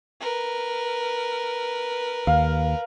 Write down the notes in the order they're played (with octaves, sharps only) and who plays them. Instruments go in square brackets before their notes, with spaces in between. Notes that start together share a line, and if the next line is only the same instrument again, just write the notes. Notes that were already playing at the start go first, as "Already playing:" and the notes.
[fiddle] A#4 B4
[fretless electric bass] D#2 [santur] F5